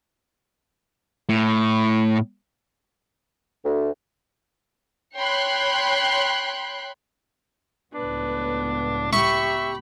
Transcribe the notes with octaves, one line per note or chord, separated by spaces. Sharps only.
A2
D2
C#5 G5 B5 C6 F#6
C#2 A2 B3 D4 B4
G4 E5 B5 C#6